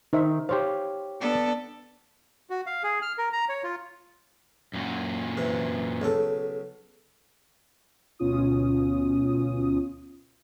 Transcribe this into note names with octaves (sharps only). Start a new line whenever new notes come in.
D#3 D#4 C5 E5
G4 C5 C#5 F5
B3 D4 A4
F#4
F5
G#4
F6
A#4
A#5
C#5
F4
F#2 A#2
C3 E3
B1 C#3 A4
D2 B2 C#4 F4 D#6